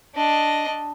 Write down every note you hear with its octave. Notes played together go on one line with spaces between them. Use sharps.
D4 D#5